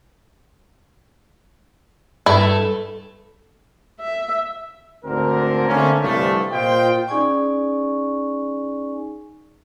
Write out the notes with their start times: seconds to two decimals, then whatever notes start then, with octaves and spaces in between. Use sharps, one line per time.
2.26 G2 A3 E4
4.00 E5
5.05 D2 G#2 D3 C4 A#4
5.68 D3 A3 A#3 C4 C#4
6.02 C2 G2 D3 E3 F3 A3
6.52 A#2 F4 C5 D#5 G5
7.08 C#4 D#4 G#4 D5 G#5 C#6